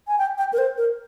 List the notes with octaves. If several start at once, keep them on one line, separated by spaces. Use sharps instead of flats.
G#5
G5
G5
A#4
C5
A#4